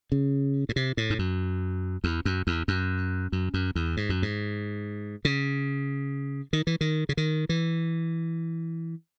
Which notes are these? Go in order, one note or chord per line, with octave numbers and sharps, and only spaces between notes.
C#3
A2
C3
A2
G#2
F#2
E2
F#2
E2
F#2
F#2
F#2
E2
G#2
F#2
G#2
C#3
D#3
E3
D#3
C#3
D#3
E3